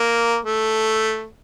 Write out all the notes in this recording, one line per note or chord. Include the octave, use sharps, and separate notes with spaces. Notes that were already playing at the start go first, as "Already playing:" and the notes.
Already playing: A#3
A3